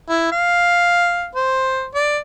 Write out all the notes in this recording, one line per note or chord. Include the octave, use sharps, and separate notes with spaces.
E4
F5
C5
D5